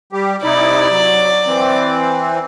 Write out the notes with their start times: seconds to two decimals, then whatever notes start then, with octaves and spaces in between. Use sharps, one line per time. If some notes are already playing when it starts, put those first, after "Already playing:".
0.13 G3 G4
0.43 C3 D#4 E4 D5
0.91 F#3
1.46 E3 C4